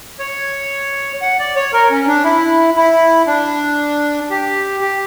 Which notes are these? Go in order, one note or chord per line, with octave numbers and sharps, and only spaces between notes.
C#5
F#5
D5
C#5
A#4
C#4
D4
E4
E4
D4
G4
G4